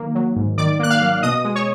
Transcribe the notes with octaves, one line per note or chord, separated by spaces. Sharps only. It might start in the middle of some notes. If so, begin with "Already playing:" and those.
Already playing: D#3 F#3 A#3
F#3
G#2
D#3 D5 D6
A#3 F#6
F5 F6
F#3
B2 D#5 D#6
G#3
C#5 C#6